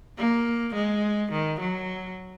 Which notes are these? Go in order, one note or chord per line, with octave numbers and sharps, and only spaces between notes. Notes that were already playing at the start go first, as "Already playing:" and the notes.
A#3
G#3
D#3
F#3